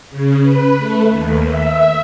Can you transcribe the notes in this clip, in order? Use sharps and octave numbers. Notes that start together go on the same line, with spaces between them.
C#3
B4
A3
D#2
E5